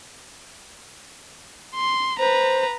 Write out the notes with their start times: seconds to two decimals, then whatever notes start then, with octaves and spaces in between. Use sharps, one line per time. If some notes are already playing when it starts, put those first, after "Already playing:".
1.75 C6
2.19 B4 C5 A#5